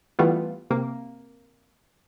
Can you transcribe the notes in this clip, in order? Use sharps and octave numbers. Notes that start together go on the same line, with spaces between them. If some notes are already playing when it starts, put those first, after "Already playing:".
E3 G3 A3 B3 F4
C3 A#3